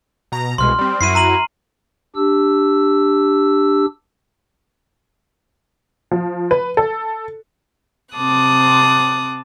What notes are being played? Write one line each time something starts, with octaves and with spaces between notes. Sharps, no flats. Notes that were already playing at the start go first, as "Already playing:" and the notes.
B2 A#5
C2 B2 G#3 C6 F6
G3 C4
F#2 E4 F#4 C7 D#7
A#5 D#7 F#7
D4 G4 E6
F3
B4
A4
C3 C4 A5 D6 D#6 F#6